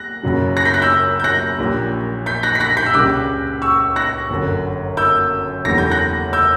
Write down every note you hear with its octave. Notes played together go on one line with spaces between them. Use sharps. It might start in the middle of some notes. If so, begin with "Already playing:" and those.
Already playing: F#6 A#6
F#1 F#2 C#3 F#3
F#6 A#6
G6 B6
F#6 A#6
E6 G6
G6
F#6 A#6
A#1 A#2 G3
G6 B6
F#6 A#6
B6
F#6 A#6
G6 B6
E6
C#2 C#3 G3 D6 F#6
C#6 E6
F#6 A#6
G1 F#2 D3
E6 G6
F#1 E2 D3 G3 A#6
G6
F#6 A#6
E6 G6